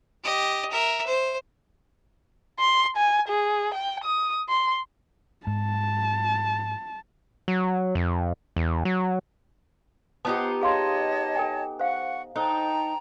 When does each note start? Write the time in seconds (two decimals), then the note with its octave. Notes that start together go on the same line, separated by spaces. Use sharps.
0.24 G4 D#5
0.71 A#4 E5
1.06 C5
2.59 C6
2.97 G#5
3.28 G#4
3.74 G5
4.04 D#6
4.49 C6
5.47 G#2 A5
7.48 F#3
7.95 F2
8.56 E2
8.85 F#3
10.25 B3 D#4 F4 G4 C5 C#5 F#5 A5
10.61 G#4 C#5 D#5 F5 A5 C6
11.35 A4 G5 G#5
11.79 C5 F5 F#5 C#6
12.36 D#4 A4 C5 C#5 G5 A5 A#5